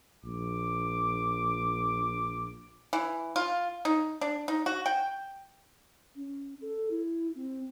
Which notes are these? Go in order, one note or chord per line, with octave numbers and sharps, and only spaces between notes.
A#1 D6
E3
F4
D#4
D4
D#4
F#4
G5
C#4
A4
E4
C4